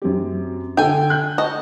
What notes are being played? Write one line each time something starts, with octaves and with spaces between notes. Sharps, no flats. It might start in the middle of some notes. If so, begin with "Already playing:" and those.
F#2 C4 G4
D3 A4 G5 G#5
F#6 G6
F#4 A4 D#5